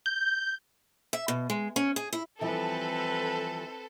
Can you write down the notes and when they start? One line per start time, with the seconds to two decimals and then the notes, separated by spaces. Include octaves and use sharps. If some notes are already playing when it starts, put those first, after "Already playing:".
0.06 G6
1.13 E5
1.28 B2
1.50 G#3
1.76 C#4
1.96 G#4
2.13 E4
2.41 E3 F3 G3 C4 A4 B4